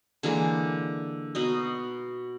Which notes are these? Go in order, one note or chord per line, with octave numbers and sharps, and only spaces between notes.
D3 E3 G#3 A#3
B2 D#4 D#5